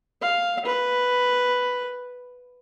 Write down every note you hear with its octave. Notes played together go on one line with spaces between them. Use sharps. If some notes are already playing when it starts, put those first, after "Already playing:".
F5
B4